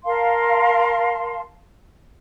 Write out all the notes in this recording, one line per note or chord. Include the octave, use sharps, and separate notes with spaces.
A#4 F5 A5 C6